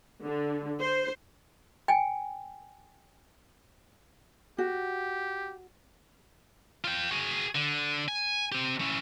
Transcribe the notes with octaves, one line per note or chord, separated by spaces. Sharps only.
D3
C5
G5 G#5
F#4 G4
F4 G5
F#4 G#4
D3
G#5
C4 G4
C#4 E4